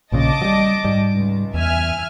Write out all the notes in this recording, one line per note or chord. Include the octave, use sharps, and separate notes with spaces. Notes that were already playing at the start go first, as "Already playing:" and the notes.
A#1 A#2 C#3 D#5 A5 D6
F#3 G3
G#2 G3
C#2
E2 E5 G#5 F6